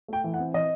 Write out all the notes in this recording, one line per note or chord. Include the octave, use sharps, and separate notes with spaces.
A3 G5
E3
F#5
C4
E3 D#5